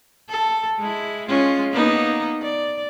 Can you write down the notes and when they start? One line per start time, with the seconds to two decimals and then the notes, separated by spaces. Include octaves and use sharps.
0.30 A4
0.79 G#3 E4
1.28 G#3 C#4 F4
1.71 A#3 B3 D#4
2.42 D5